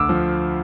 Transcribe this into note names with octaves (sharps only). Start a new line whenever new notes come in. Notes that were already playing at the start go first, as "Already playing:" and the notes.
Already playing: D2 D6 E6
F3